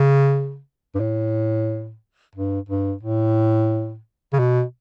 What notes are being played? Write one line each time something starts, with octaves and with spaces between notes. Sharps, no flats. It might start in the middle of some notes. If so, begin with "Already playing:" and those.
Already playing: C#3
G2
A2
G2
G2
A2
C#3
B2